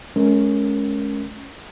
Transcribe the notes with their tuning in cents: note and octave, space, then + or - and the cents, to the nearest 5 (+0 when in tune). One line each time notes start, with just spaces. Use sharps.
G#3 +40 C#4 +0 A#4 +0